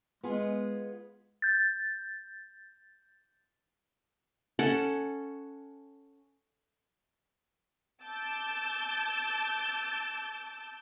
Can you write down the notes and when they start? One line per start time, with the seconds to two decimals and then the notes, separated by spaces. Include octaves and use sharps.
0.23 G#3 B3 F4 G#4
1.42 G6 A6
4.59 C#4 A4 F#5
8.04 A5 D6 E6 G6 A6